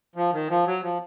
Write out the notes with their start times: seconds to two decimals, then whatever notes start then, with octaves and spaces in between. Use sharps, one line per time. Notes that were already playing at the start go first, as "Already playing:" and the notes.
0.16 F3
0.33 D#3
0.50 F3
0.66 F#3
0.83 F3